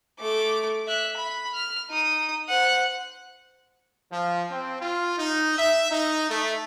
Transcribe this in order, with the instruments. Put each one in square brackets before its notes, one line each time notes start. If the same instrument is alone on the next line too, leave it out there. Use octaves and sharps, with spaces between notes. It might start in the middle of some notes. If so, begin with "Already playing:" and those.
[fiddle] A3 D6
E5 F#6
B5
F6
D#4 D#6
C5 F#5
[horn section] F3
C4
F4
D#4
E5
D#4
A3